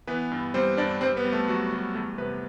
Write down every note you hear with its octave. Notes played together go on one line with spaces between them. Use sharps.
E3 B3 B4
G2
G3 C4 C5
G2 D4 D5
G3 C4 C5
B3 B4
G3
A3 A4
F#3 G3 F#4
G3
E2 A3 A4
C3 B3 B4